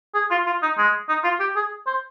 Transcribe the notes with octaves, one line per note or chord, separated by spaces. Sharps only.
G#4
F4
F4
D#4
G#3
D#4
F4
G4
G#4
C5